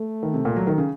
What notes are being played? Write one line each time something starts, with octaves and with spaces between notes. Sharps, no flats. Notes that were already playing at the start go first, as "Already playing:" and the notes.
Already playing: A3
D#3
C3
A#2
F#3
D#3
C#3